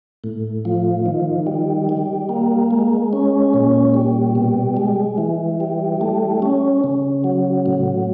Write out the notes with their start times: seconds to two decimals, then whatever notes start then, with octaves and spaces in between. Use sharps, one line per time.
0.24 A2
0.65 F3
1.06 D#3
1.47 G3
1.89 G3
2.29 A#3
2.71 G#3
3.13 C#4
3.54 A#2
3.94 G3
4.35 B2
4.77 G#3
5.18 E3
5.60 G3
6.01 A3
6.42 C#4
6.84 C#3
7.24 F#3
7.66 A2